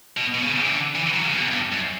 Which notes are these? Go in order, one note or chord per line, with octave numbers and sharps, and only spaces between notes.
B2
B2
C#3
E3
D3
E3
F#3
C#3
B2
G2
F#2